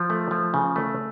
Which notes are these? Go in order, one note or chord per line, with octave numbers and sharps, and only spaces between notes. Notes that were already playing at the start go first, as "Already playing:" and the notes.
Already playing: F3
A3
F3
C#3
A3